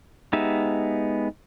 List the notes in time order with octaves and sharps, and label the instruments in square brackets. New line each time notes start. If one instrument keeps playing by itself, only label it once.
[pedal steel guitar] G#3 B3 D#4 G4 E5